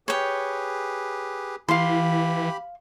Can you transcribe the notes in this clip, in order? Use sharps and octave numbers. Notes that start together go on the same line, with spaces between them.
G4 G#4 B4 C#5 G5
E3 G4 F5 B5 C6